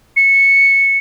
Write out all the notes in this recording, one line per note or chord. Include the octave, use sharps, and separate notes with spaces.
C#7